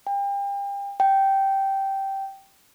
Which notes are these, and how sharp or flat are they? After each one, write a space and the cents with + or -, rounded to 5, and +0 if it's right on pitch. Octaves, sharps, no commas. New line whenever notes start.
G5 +35
G5 -10